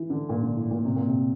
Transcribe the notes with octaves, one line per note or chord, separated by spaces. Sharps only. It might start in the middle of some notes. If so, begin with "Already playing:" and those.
Already playing: E3
D3
A#2
D3
A2
A#2
C3
A#2
C3